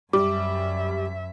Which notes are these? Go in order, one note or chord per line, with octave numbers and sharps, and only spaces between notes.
F#2 G3 E5 D6